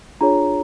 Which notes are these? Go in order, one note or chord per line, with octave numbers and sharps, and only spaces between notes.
D4 F4 G#4 C#5 A#5